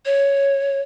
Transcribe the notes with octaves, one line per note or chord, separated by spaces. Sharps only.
C#5